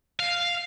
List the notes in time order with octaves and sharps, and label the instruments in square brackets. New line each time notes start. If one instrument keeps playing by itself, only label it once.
[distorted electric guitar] F5